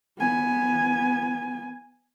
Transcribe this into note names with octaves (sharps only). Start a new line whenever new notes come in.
B3 G#5